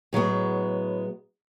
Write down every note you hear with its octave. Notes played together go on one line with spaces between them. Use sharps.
A2 F#3 G#3 B3